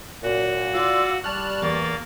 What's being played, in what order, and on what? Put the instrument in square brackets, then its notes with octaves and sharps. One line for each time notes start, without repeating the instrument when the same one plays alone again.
[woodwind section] F#2 A#2 [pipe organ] F#4
[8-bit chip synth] F4 D5 [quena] E6
[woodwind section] G3 [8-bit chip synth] A5 F6 F#6 [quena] C#6
[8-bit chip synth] E2 A6 [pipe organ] A#3